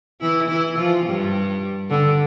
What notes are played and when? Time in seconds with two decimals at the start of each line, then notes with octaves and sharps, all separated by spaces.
0.21 E3 E4
0.49 E3 E4
0.77 F3 F4
1.05 G2 G3
1.90 D3